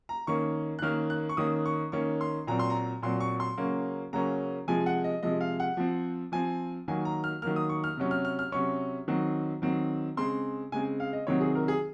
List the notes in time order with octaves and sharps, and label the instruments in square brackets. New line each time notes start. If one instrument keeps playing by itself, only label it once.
[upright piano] A#5
D#3 A#3 C#4 C#6
F#6
D#3 A#3 C#4 F6
F#6
C#6
D#3 A#3 C#4 D#6
C#6
D#3 A#3 C#4 C#6
C6
A#2 F#3 C4 A#5
C6
A#5
A#2 F#3 C4 C6
C#6
C6
C#3 F#3 A#3 C#4
C#3 F#3 A#3 C#4 A#5
C3 F3 G#3 G#5
F#5
D#5
C3 F3 G#3 D#5
F5
F#5
F3 C4
F3 C4 G#5
D#3 F#3 A#3 G#5
A#5
F6
D#3 F#3 A#3 F6
D#6
C#6
F6
C3 F#3 C#4
F6
F6
F6
C3 F#3 C#4 C#6
D#3 F#3 C4
D#3 F#3 C4
C#3 G#3 C4 C6
C#3 G#3 C4 G#5
F5
D#5
C3 D#3 F#3 C4 C#5
G#4
A#4
G#4